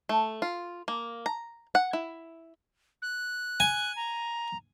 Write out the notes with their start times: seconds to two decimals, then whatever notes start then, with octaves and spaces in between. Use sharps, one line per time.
0.09 A3
0.42 F4
0.88 A#3
1.26 A#5
1.75 F#5
1.93 E4
3.02 F#6
3.60 G#5
3.96 A#5